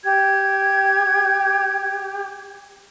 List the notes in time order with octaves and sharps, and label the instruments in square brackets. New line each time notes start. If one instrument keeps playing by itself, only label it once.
[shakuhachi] G4 [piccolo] G#6